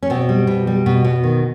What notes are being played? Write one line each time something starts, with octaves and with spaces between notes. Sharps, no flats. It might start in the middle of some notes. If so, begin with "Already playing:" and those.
C#4
B2 C4
G3
B2
G3
B2
B2
D#3